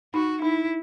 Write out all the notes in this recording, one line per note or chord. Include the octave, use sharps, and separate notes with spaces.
D#4 F#4
D#4 E4